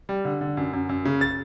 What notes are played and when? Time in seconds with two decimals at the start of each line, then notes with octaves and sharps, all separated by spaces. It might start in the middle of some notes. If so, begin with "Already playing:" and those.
0.09 G3
0.25 D3
0.41 D3
0.57 F#2
0.73 F#2
0.89 F#2
1.05 C#3
1.21 A6